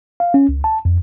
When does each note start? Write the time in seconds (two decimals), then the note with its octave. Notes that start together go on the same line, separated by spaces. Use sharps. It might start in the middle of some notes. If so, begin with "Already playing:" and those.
0.20 F5
0.34 C#4
0.49 C#2
0.64 A5
0.85 F2